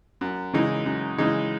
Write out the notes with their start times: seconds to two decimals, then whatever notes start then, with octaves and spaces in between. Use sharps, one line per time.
0.21 F#2
0.53 C#3 E3 G#3 D#4
0.86 F#2
1.18 C#3 E3 G#3 D#4